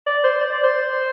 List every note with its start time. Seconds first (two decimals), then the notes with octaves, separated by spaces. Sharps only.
0.07 D5
0.24 C5
0.41 D5
0.52 D5
0.64 C5